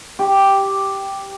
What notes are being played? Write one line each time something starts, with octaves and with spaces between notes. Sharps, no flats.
G4